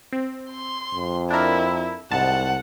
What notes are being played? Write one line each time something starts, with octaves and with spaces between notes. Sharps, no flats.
C4
C6
F2
D4 E4 A#4
C2 G#2 F#5 A5